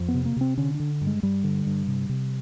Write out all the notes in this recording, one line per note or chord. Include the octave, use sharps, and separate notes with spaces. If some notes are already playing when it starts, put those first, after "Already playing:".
Already playing: F2
B3
C3
A#3
C3 C4
D3 C#4
D4
D3
G2
G#3
G2 G3
D3
G2
C3
C3